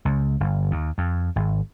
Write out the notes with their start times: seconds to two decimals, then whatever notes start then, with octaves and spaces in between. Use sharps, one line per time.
0.05 C#2
0.40 G1
0.71 D#2
0.98 F2
1.36 G#1